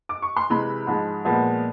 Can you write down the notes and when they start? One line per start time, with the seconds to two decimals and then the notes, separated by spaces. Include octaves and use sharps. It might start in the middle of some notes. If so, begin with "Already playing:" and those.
0.09 D6
0.22 C#6
0.36 C6
0.50 C3 E3 G#3 B5
0.87 G#2 F3 G#3
1.25 A#2 F3 G#3 B3